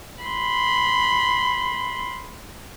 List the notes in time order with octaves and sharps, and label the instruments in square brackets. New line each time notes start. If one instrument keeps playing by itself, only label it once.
[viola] B5 C6